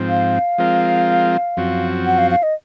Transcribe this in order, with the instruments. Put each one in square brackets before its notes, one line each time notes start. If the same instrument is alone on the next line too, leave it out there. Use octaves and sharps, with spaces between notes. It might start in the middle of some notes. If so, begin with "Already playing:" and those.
Already playing: [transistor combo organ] G#2 F3 C4
[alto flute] F5
[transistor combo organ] F3 G#3 C4 F4 A#4
F#2 F3 C4 F#4
[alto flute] F#5
F5
F5
D#5